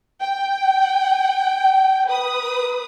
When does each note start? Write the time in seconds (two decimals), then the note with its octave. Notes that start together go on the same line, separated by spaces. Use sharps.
0.20 G5
2.08 B4 D#6